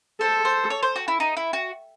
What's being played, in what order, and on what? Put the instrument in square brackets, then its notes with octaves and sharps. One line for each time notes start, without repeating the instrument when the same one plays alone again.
[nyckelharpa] A4 [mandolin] C5
[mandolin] C5
C#5
C5
F#4
E4
D#4
E4
F#4